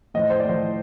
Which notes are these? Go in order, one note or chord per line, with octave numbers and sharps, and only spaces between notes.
A2 F3 D#5
C5
D5
A2 F3 C5